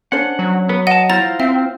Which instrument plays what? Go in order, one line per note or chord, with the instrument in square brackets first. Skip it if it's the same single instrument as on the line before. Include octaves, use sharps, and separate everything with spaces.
[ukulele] C#4 D4 C5 [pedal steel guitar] F#5
[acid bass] F#3
[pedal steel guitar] B3 [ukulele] B4
[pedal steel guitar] D#5 A5 [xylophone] F#5
[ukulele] E4 [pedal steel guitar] F4 C5 A#5 [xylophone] A6
[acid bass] C4 [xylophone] E5